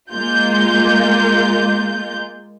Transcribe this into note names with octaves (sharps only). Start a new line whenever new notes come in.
G#3 A#3 F4 G6